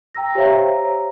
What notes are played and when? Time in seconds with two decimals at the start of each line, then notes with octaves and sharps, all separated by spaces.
0.15 G5 A#5 E6 A#6
0.35 G4 C5 C#5 E5 F5 A#5